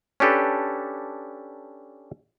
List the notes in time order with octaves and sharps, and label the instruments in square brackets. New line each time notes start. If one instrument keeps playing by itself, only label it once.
[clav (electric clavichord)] C#4 D4 G4 A4 B4